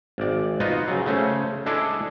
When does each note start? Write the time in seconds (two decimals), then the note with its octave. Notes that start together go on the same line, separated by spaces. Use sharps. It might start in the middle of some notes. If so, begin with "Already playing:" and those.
0.18 G#1 D5
0.60 B3 D#4 F4 F#4 D#5
0.87 C#3 F#3
1.06 C#3 A3 C#4 C5
1.66 G#3 D4 E4 G#4 A4 D5